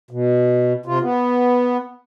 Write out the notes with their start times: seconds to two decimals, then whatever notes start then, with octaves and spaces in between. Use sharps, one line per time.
0.11 B2
0.86 C3 F4
1.01 B3